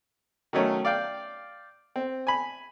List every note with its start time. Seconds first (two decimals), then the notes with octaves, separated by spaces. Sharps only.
0.53 D#3 F#3 A3 C#4
0.85 D5 F5 G5
1.96 C4
2.27 G#5 B5